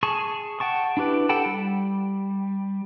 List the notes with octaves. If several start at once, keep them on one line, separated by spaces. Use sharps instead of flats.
G#4 A5 C#6
F#5 G5 A5 C#6
D4 E4 G4 B4
A4 F#5 G5 A5 B5
G3